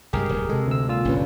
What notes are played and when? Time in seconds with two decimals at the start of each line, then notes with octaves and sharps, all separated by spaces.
0.13 C2 G2 G#3 G4 G#4 A#4
0.29 D1
0.49 C3 G#3 A4
0.67 D2 E6
0.88 A#2 F4 E6
1.05 G1 D2 C#4 D4 B4